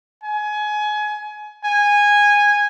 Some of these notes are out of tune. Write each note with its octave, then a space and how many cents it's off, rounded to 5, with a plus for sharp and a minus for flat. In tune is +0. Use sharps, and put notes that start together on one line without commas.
G#5 +25
G#5 -15